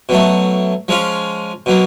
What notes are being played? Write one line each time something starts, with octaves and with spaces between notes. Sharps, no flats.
B2 F#3 A3
F3 G#3 C#4 F4
B2 F#3 A#3